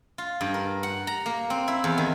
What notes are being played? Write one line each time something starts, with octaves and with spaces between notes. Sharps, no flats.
F4
G2
A#4
F#5
A#5
A#3
C4
E4
E2
D#3